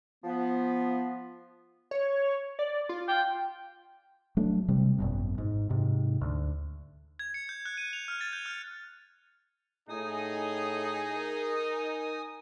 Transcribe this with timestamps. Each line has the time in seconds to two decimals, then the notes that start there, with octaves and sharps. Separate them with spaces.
0.24 F3 B3
1.91 C#5
2.59 D5
2.89 F4
3.08 G5
4.37 F#3 A3 D4
4.68 C3 G3 C4
4.98 G#1 F#2 B2
5.38 G#2
5.70 G#2 C3
6.21 D2
7.19 G#6
7.34 C#7
7.49 G6
7.66 F#6
7.78 D#7
7.93 F7
8.08 F6
8.21 A6
8.33 G6
8.46 F6
9.89 A2 D#4 G#4 G#5 D#6
11.16 A#4